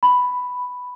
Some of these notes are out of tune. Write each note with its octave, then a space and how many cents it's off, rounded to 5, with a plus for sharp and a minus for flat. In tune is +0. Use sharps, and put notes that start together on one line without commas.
B5 +5